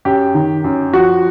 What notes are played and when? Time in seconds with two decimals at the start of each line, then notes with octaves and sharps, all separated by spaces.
0.05 F#2 G4
0.35 D#3
0.64 F#2
0.93 F3 F#4